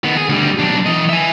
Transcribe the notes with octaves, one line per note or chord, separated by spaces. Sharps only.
D#3 B3
G#4
D2 G3
B1 D4
E3 D#5
E5 G#5